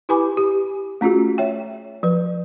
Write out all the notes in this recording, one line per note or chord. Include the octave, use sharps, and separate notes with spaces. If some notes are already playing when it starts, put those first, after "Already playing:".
E4 G4 B4 G#5 B5 D6
G4
A3 C#4 F4 F#4 G#4
C#5 E5 G5
F3 B4